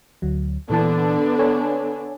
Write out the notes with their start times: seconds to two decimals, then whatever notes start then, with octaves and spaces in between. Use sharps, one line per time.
0.22 D2 F#3
0.70 A#2 D3 E3 B3 D4 A5
1.39 A4 C#5 G#5